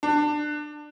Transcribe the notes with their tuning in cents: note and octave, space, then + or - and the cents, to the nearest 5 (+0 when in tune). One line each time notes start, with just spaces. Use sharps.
D4 +20